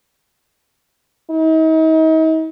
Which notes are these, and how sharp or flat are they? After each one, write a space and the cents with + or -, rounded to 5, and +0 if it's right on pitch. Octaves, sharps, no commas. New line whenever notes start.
D#4 +40